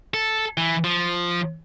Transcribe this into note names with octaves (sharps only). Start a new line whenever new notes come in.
A4
E3
F3